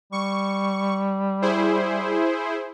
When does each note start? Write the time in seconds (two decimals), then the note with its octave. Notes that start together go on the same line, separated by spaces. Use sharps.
0.12 G3 C#6
1.42 E4 G#4 C5